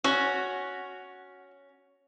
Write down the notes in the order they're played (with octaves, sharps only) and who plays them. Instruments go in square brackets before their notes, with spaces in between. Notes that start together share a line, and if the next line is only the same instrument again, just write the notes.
[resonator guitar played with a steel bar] C#4 [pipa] F#4